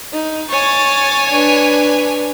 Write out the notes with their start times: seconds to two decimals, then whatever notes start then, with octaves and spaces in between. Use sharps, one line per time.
0.13 D#4
0.51 C#5 G#5 C#6 A6
1.30 D4 B4